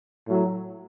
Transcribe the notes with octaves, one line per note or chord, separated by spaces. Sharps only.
A2 F#3